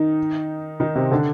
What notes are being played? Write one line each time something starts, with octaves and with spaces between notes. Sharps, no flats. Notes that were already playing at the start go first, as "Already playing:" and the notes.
Already playing: D#3 D#4
D#3 D#4
C3 C4
D3 D4